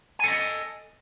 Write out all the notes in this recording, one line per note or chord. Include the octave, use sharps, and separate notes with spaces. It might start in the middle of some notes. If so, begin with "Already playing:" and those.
A4 D#5 G#5